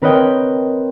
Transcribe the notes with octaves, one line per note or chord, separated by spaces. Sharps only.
C4 A#4 B4 C#5 D#5 G5